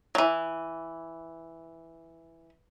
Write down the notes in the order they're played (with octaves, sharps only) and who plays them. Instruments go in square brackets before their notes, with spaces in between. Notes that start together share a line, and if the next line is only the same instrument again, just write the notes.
[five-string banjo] E3 F#3